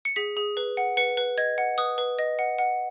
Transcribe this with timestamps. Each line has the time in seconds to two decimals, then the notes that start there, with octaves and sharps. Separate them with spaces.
0.05 C#7
0.16 G#4 B6
0.37 G#4
0.57 B4
0.77 F#5
0.97 B4 C#7
1.17 B4
1.38 D#5 G#6
1.58 F#5
1.78 B4 D#6
1.98 B4
2.19 D#5
2.39 F#5
2.59 F#5